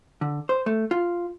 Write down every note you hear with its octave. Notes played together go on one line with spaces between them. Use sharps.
D3
C5
A3
F4